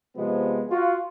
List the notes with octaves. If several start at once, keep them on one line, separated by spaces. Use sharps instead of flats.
C3 F3 G#3 B3
F4 F#4